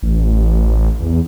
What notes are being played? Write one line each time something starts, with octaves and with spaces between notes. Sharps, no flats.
A1
E2